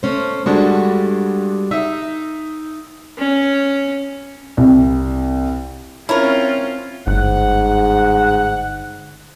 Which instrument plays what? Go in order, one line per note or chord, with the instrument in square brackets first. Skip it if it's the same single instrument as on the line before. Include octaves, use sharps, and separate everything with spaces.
[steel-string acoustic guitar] A3 C#4 C5
[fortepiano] G2 G#3 D4 [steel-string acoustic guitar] G3 F#4 A4
[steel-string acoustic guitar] D#4 [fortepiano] E5
[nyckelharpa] C#4
[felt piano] C2
[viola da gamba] C4 C#4 F4 [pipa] E4 A#4 [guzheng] C#5
[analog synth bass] G1 [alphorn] G#2 [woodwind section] F#5